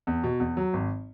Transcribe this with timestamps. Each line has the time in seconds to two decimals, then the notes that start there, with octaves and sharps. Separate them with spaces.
0.07 E2
0.24 B2
0.40 E2
0.57 F#3
0.73 G#1